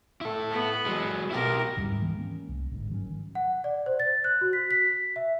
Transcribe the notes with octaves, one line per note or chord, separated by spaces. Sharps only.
E4 A4
B3
F#3 G#3
B2 E4 G4 A#4
D1 G#2 G3 C#4
D#3 E3 G#3 B3
A#3 C#4
C2
G1 G#2
D#3 F#3 A#3 C#4
F#5
D5
C5
A6
F#6
F#4
B6
B6
E5